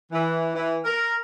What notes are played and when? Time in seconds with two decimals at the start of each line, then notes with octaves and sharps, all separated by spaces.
0.11 E3
0.55 E3
0.85 A#4